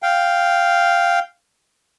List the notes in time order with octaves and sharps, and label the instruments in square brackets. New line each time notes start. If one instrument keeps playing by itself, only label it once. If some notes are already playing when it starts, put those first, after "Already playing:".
[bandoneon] F5 G5